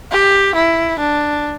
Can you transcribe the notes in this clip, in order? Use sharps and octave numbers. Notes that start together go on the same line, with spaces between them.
G4
E4
D4